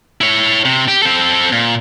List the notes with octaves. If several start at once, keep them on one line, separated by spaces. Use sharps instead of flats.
E4 C#5
C3
G4
C4 A4
A#2